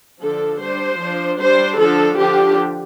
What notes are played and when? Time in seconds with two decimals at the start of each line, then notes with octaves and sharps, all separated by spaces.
0.21 D3 F3 D4 A4
0.60 G3 D4 C5
1.00 F3 D4
1.39 G3 D4 C5
1.78 D3 F3 D4 A4
2.17 D3 F3 D4 G4